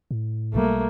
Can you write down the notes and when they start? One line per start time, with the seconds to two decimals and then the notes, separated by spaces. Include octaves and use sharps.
0.11 A2
0.54 B1 F3 G3 A3 A#3